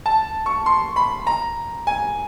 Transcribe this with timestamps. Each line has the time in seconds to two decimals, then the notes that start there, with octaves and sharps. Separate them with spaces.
0.06 A5
0.46 C#6
0.66 C6
0.96 B5
1.27 A#5
1.87 G#5